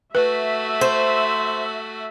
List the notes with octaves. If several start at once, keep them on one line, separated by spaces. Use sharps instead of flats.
A3 F#4 B4 E5
C5